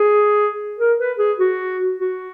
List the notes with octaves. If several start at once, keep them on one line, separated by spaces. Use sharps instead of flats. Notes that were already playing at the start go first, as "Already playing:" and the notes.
Already playing: G#4
A#4
B4
G#4
F#4
F#4